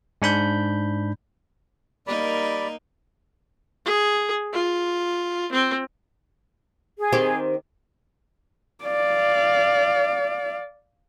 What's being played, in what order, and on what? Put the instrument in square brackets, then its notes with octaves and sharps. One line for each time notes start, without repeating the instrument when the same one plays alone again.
[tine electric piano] G#2 D4 B5 G6
[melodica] G3 D5 B5 [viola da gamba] A#3 D#4 A#4
[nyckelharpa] G#4
F4
C4
[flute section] G#4
[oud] D#3 C4 G4
[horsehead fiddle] D5 F5